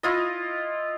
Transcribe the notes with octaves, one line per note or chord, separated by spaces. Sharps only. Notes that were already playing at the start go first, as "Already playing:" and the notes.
E4 F4 D#5